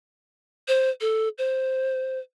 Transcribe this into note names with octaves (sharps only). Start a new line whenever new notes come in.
C5
A4
C5